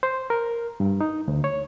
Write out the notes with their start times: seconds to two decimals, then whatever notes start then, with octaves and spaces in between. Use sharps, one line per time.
0.03 C5
0.30 A#4
0.80 G2
1.01 D#4
1.28 D2
1.44 C#5